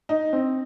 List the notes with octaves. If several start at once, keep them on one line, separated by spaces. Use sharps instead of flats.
D#4
C4